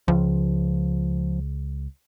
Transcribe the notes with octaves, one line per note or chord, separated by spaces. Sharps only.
C#2 F3